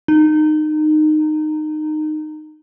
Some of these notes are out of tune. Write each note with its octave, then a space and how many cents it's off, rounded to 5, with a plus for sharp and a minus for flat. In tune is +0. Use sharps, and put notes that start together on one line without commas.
D#4 -20